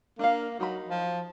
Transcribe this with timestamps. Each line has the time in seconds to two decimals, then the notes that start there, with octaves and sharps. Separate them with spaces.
0.19 A#3 D4 F5
0.60 F#3 D#4 B5
0.89 F3